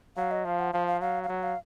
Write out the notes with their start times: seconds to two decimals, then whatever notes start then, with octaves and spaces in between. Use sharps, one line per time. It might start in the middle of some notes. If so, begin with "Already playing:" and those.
0.17 F#3 F5
0.31 D#5
0.45 F3 F5
0.59 F#5
0.73 F3 F5
0.87 F5
1.01 F#3 F5
1.23 F5
1.29 F#3 F#5
1.43 F5